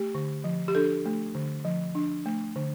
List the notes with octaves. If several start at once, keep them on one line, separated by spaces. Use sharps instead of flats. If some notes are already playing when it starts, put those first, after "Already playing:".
Already playing: A3 G4
D3
F3
G4
D4 A4
A3
D3
F3
D4
A3
D3